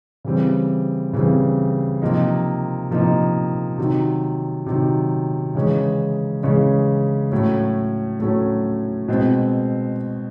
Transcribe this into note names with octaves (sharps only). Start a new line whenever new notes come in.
C#3 E3 G3 C4
C#3 E3 G3 C4
C3 F3 A#3 D#4
C3 F3 A#3 D#4
C3 D#3 F#3
C3 D#3 F#3
C#3 E3 G#3 C#4
C#3 E3 G#3 C#4
A2 F#3 A3 C#4
A2 F#3 A3 C#4
B2 G#3 C4